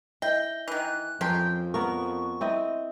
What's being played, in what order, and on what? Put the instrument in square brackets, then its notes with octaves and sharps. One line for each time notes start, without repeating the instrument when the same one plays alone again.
[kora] E4 [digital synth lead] D#5 [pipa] G5
[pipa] D#3 E3 [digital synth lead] F#6
[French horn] F2 [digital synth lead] F3 [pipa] C#4 G5 C6 [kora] A#4
[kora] B3 A#4 [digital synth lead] C#6
[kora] C4 E4 D#5